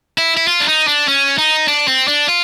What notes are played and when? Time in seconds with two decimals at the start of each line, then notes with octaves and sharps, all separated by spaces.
0.18 E4
0.37 E4
0.48 F4
0.60 D4
0.68 D#4
0.87 D4
1.08 C#4
1.38 D#4
1.68 D4
1.88 C4
2.08 D4
2.28 F4